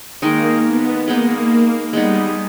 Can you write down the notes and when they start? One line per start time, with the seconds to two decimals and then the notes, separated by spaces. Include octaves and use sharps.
0.22 D#3 G#3 A#3 D#4 A#4
0.66 B3
1.08 G#3 A#3 B3 D#4
1.93 G3 G#3 B3 D#4 G#4